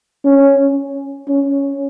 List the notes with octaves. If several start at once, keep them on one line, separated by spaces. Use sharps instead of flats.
C#4
C#4